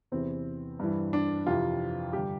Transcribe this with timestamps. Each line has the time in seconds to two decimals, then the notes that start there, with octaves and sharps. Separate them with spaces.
0.12 E2 C3 E3 C4
0.79 G2 E3
1.13 D4
1.47 F2 C3 E3 F4
2.13 G2 D3 G4